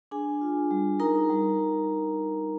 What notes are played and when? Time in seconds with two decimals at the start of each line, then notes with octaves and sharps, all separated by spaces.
0.11 D4 G#4 G#5
0.41 F4
0.71 G3
1.00 D#4 A#4 A#5
1.29 G3